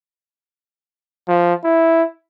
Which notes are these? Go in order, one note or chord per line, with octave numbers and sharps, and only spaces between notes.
F3
E4